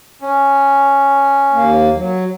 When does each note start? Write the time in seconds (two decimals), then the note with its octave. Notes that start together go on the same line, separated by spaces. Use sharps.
0.22 C#4
1.53 D#2 A#3
1.94 F#3